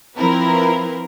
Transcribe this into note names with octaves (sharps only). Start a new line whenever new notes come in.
F3 C4 E4 A#4 B4